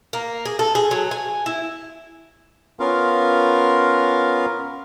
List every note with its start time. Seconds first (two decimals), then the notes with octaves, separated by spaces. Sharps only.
0.13 A#3
0.45 G#4
0.59 A4
0.75 G#4
0.91 F#3
1.11 G#5
1.46 E4
2.80 B3 C#4 F4 A#4 F5